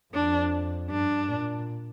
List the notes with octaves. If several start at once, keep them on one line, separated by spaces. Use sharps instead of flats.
F2 D4
G2 D4
A#2